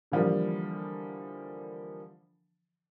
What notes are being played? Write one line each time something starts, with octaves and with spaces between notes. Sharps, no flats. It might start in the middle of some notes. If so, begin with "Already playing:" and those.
D3 E3 F3 G3 A#3 D4